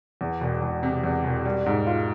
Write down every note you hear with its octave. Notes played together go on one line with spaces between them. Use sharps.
E2
E1
E1
C3
E2
E1
G3
G#2
F4